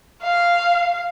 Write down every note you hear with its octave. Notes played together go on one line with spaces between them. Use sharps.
F5